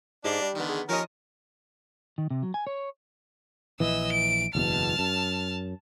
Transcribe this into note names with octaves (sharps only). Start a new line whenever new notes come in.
G#2 D4 G4 D#5 F5
G3
E2 D3 D#3 B3
G#4
D#2 F3 C#4 A#4 D#5
D#3
C3
F#3
G#5
C#5
A#1 E3 D#5 E6
D7
F#1 E2 B2 A5 F6
F#2